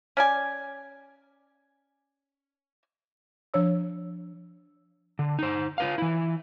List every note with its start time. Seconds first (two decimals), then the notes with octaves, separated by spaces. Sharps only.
0.17 C#4 D5 G#5
3.54 F3 D4 C#5 E6
5.19 D3
5.39 D#4 C5
5.78 F4 B4 F5
5.98 E3 E4